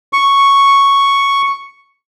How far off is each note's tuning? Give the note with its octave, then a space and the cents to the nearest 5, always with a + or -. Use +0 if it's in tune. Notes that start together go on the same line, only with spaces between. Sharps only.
C#6 +0